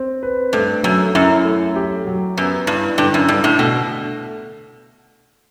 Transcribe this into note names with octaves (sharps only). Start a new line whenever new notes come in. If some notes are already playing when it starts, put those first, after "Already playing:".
Already playing: C4
B4
G2 A3
F#2 F#3
F#2 E4
A3
G4
F#3
F#2 B3
G2 E4
G2 D3
F#2
G2 D3
A2
B2 A3